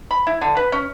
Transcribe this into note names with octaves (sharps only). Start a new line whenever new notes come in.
B5
E4
D3
B4
C#4